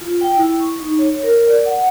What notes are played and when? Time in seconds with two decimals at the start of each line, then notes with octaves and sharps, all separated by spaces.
0.01 F4
0.21 G5
0.37 E4
0.60 C#6
0.80 D#4
0.99 C#5
1.23 A#4
1.48 D5
1.65 F#5